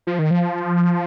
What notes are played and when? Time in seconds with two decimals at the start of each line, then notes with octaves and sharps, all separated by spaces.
0.07 F3
0.19 D#3
0.31 F3